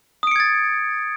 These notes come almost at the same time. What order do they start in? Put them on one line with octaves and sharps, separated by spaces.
D#6 D7 C#7 G#6 A6